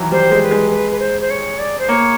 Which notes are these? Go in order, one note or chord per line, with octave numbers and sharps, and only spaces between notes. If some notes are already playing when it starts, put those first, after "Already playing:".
Already playing: D#3 E3 F#3
G3 C5
G#3
C5
B4
G#3
B4
B4
C5
C5
C#5
D5
C5
A#3 C#5